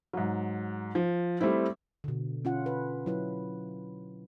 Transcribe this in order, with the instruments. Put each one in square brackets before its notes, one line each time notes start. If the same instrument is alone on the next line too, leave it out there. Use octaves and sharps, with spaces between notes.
[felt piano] G#2 F#3
F3
G3 A3 C4 E4
[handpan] B2 D3
C#4 F4 F#5
B4
F#3 E4 B4